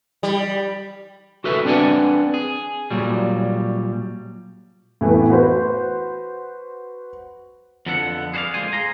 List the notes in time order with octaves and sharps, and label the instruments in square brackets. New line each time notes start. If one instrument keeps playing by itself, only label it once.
[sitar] G3
[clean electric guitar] F#4 A4 B4 E5
C4 D4 B4 D5 F#5 G#5
G#4
A#2 F#3 G3
[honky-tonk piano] A2 E3 A3 B3
F#4 B4 C5
[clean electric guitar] F2 D3 F3 B3 A4 F#5
G#4 B4 C5 D5 F5
F2 A#2 G#3 F4 C5 G#5
G#4 A#5 C6